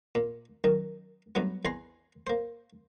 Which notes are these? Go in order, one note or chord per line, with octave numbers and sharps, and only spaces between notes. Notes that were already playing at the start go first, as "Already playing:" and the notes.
A#2
F#2 D#3
G2 F#3 A3 B3
E2 G#5 A#5 C6
A#3 C5